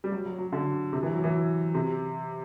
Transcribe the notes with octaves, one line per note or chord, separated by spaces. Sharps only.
G3
F#3
F#3
F#3
D3
C3
E3
F#3
E3
C3